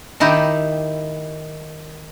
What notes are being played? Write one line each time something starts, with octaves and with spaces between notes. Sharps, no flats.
D#3 D#4 E4 G4